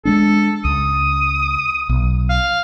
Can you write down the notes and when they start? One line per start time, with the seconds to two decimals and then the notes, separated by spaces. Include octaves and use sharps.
0.05 G#3 A3 D4 A4
0.65 C#2 D#6
1.89 B1
2.30 F5